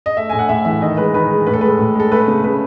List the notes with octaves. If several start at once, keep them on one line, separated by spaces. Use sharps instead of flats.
D#5
A3 E5
A2 G#5
F#5
A2 E5
E3 E5
D#3 D#5
G#3 B4
D#3 B4
G#3
A2 B4
A4
G#3 B4
A2
G#3 A4
A3 B4
C#3
C#3 B4